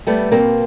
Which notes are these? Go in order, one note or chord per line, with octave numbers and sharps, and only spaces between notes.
G3 A3 B3
B2 A#3 C4